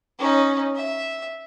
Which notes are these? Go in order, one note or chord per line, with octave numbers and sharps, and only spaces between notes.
C#4 D#4
E5